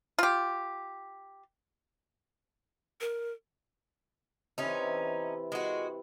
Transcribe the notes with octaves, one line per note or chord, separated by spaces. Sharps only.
F4 G4
A#4
C3 E3 C#4 D#4
G#3 F#4